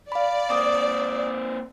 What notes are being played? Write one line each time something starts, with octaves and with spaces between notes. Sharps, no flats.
D5 F5 B5
A#3 C4 D6 D#6